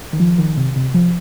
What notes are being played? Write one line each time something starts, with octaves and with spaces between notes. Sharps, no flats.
D#3
F3
D#3
C3
C3
F3